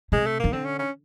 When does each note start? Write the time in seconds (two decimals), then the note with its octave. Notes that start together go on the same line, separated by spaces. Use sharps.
0.12 C3 G#3
0.26 A3
0.39 D#3 A#3
0.52 D3 C4
0.65 C#4
0.79 C#4